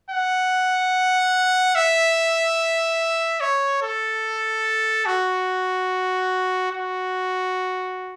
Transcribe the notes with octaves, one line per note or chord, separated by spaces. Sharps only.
F#5
E5
C#5
A4
F#4
F#4